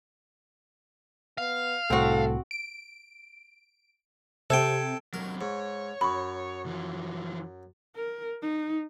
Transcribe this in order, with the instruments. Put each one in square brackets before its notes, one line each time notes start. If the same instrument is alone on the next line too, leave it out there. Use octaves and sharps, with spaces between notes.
[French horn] B3 [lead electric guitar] F5
[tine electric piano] C2 A2 [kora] C4 F#4 [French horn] A4
[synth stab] D7
[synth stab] C3 G#6 [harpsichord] A4 G5
[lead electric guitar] D#2 F#3 [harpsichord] A#4
[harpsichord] G#2 [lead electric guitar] C#5
[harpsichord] F#2 [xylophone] B5 C#6
[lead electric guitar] E3 F3
[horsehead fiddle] A#4
D#4